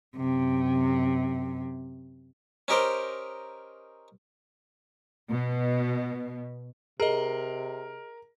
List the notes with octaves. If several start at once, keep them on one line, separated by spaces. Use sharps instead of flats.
F#2 C3
C#4 D#4 G4 A#4 C5
B2
C3 G#4 A#4 D#5